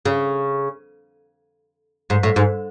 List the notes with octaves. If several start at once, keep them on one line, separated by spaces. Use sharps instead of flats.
C#3
G#2
A2
G#2